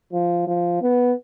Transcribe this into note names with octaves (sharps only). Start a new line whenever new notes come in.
F3
F3
B3